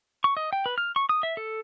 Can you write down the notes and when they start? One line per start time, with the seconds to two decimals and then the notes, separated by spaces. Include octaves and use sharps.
0.24 C#6
0.37 D#5
0.53 G5
0.66 B4
0.78 F6
0.96 C#6
1.09 D#6
1.23 E5
1.37 A4